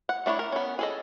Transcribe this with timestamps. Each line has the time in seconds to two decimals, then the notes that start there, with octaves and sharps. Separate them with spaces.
0.09 F#5
0.26 A3 D4 E4 C#5
0.39 A#4
0.52 B3 C#4
0.79 G#4 A4 D#5